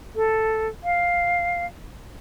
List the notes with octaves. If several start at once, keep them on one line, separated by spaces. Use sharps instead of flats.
A4
F5